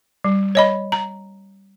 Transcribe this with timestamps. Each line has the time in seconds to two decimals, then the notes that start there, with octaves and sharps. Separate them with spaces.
0.24 G3
0.55 C#5 D#5 B5
0.92 A#5